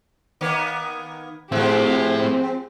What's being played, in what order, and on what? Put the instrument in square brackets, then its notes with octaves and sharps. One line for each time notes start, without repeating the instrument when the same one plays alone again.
[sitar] D#3 A#3 B3
[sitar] F3 G#3 [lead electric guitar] A3 E4 [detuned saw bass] C4 [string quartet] G4 C5